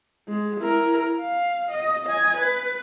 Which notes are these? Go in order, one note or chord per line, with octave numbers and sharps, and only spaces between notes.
G#3
E4 A#4
F5
D#5
D#5 G#5
B4